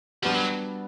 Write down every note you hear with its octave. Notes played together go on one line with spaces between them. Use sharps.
F3 G3 B3 D4 F#4
F#3